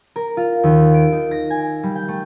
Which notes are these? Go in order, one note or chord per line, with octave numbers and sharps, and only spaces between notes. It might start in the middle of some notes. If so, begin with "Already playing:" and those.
A#4
F4
D#2
D7
D#4
A#6
G#5
G3
G5
A3